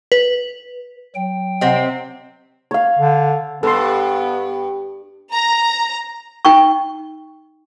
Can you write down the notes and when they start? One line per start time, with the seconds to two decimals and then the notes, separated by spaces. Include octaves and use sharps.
0.12 B4
1.15 F#3 G5
1.61 C3 C4 D#5 F#5
2.71 C#5 F5
2.99 D3
3.63 G2 B3 A4 C6
5.33 A#5
6.45 D#4 G5 C#6